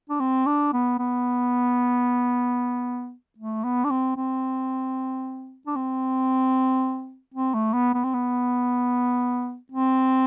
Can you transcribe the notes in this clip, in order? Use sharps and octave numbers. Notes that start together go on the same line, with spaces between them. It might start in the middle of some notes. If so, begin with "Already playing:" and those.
D4
C4
D4
B3
B3
A3
B3
D4
C4
C4
D4
C4
C4
A3
B3
B3
C4
B3
C4